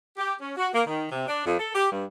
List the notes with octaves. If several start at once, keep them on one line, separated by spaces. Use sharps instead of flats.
G4
C#4
F#4
A#3
D#3
C3
D4
F2
A4
G4
G2